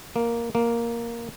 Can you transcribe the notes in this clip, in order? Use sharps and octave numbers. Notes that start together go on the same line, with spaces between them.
A#3
A#3